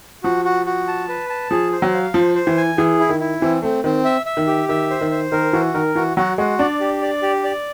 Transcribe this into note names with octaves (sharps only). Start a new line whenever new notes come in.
F3 F#4
F#4
F#4
A5
B4
A5
F3 G#4
C5
F#3
F5
F3 C5
C5
E3
G#5
E3 G#4
E4
D#3
E4
E3 C4
A3 C4
D#3 C4
E5
E5
D#3
G4
D#3 E5
C5
D#3
C5
D#3 A#4
E3 F#4
D#3 A#4
E3 F#4
F#3 F#4
G#3 F#4
D4 D5
G4
D5
G4
D5